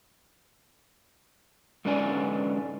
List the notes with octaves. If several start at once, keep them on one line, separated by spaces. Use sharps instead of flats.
G#2 D3 C#4 B4 D5 G#5